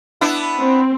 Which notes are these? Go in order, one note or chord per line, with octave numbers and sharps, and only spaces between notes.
B3 D4 E4
C4